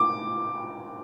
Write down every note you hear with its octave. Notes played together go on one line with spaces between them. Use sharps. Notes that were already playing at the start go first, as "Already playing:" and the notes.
Already playing: D6